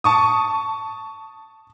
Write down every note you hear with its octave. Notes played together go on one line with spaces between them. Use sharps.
A5 C#6 D#6